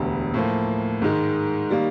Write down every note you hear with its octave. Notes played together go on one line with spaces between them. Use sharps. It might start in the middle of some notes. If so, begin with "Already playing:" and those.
Already playing: E1 D2 D3 G3 B3
A2 F3 A#3
G#2 D#3 G#3
D#3 G3 A#3